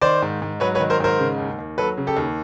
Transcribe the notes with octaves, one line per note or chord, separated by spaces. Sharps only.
D#3 C5 D5
G#2
G#2
F#3 B4 C#5
B4 C#5
D#3
A#4 C5
G#2 A#4 C5
C#3
D#2
D#2
F#3 A4 B4
C#3
G4 A4
D#2